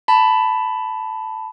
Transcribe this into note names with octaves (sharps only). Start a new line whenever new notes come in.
A5 B5